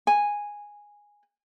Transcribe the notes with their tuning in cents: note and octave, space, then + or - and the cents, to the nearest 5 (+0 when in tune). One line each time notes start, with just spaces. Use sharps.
G#5 -10